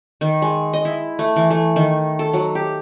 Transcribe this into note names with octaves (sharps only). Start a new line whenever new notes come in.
D#3
G#3
D#5
E4
A3
E3
A3
D#3
A4
F#3
G4